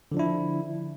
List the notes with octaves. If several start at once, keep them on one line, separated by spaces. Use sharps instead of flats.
D3 F3 D4 E4